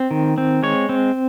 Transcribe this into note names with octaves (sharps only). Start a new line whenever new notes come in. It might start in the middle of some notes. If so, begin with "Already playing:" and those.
Already playing: C4
D#3
C4
G#3 C#5
C4